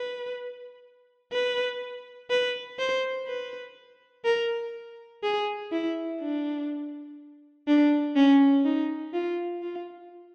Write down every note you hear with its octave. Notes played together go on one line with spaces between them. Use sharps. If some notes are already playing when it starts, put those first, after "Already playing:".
Already playing: B4
B4
B4
C5
B4
A#4
G#4
E4
D4
D4
C#4
D#4
F4
F4